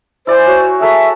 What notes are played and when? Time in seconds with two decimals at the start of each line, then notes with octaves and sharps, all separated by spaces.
0.27 E4 C5 D5 G#5
0.47 F#4 C#5 C#6
0.81 G#4 A4 E5 A#5